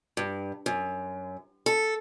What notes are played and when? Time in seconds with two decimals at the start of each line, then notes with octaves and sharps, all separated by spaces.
0.17 G2
0.66 F#2
1.66 A4